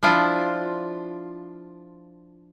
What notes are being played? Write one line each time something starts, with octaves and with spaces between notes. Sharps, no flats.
F3 D4 E4 F4